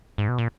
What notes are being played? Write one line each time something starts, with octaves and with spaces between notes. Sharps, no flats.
G#2
B2
A#2